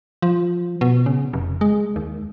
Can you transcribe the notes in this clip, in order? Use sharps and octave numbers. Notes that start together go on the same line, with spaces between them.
F3
B2
C#3
F1
G#3
D#2